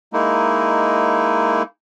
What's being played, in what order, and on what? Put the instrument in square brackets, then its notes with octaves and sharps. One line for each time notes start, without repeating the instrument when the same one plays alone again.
[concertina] G#3 A#3 D#4 E4